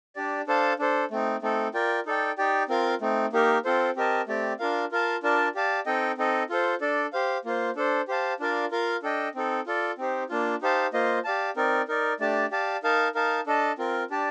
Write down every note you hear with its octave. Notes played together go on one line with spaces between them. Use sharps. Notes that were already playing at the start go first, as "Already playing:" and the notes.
D4 G4 D5
D4 A4 C5 F5 A5
D4 A4 C5
A3 C4 D#4
A3 C4 D#4 A4
F4 A#4 D5 G5
D#4 A4 D5 G5
D#4 G4 D5 G5
C4 F4 A#4 F5
A3 C4 D#4
A#3 D#4 G4 A#4
C4 F4 A4 C5
C4 G4 A#4 D#5 A5
A3 C4 G4 D5
D4 F4 A#4 F5
F4 A#4 F5 A5
D4 F4 A#4 D5 A5
G4 D5 F5 A5
C4 D#4 A4 D#5 G5
C4 D#4 A4 D#5
F4 A4 C5
D4 A4 D5
G4 C5 F5
A#3 F4 C5
D4 A4 C5
G4 C5 F5 A5
D4 F4 A#4 D5 F5
F4 A#4 F5
D4 A4 D#5 G5
C4 D#4 A4
F4 A4 D5
C4 D#4 G4 C5
A#3 D4 F4
D#4 G4 C5 F5 A5
A#3 F4 C5 D#5
G4 D5 F5 A5
C4 D#4 A#4 D5
D#4 A#4 D5
A3 D4 G4 D5 A5
G4 D5 F5 A5
D#4 A#4 F5 A5
D#4 A#4 F5 A5
D4 A4 D#5 A5
C4 F4 A#4
D4 G4 D5 A5